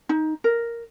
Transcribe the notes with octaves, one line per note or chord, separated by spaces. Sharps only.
D#4
A#4